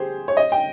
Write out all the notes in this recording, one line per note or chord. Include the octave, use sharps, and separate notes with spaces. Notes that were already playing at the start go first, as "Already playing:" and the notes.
Already playing: G4 G#4 C5
C#5
D#5
G5